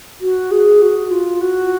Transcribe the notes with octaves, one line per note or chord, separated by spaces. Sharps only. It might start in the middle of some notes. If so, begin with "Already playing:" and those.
F#4
G#4
F#4
F4
F#4